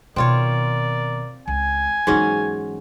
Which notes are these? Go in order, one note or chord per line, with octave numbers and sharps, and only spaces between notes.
B2 D#3 C4 F4 A#4 C#5 D5
C#2 G#5
G#2 E3 F#3 A#3 C#4